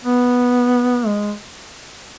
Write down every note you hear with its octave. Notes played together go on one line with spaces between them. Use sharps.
B3
G#3